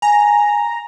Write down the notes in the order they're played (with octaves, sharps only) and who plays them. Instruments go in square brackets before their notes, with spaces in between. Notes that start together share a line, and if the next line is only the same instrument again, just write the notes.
[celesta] G#5 [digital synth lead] A#5